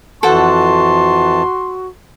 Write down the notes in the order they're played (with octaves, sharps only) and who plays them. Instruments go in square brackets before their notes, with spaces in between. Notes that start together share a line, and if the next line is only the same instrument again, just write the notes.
[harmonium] F2 E3 A5 [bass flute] F#4 [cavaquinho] A4 C5 F#5 [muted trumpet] C6